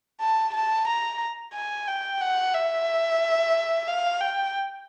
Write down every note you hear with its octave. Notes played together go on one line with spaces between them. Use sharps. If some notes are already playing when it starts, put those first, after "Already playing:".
A5
A5
A#5
G#5
G5
F#5
E5
F5
G5